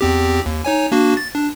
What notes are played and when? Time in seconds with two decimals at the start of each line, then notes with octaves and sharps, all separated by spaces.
0.01 E2 C4 G4
0.46 D#2
0.65 D#4 C#5 G#5
0.92 A#3 D4 F#4
1.17 A6
1.35 D4